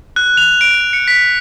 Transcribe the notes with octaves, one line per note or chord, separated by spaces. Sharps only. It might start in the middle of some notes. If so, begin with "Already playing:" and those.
F#6
F7
D7
C#7
B6